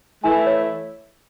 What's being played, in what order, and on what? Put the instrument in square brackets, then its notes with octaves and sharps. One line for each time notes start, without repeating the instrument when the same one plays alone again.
[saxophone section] E3 A3 E4 [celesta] G#5
[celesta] C#5